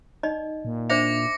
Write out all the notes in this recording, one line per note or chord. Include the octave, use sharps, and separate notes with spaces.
D#4 D5 D#5
A#2
D4 C5 D5 E5 D6 A#6 C#7 F7